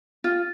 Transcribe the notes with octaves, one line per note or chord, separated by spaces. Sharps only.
F4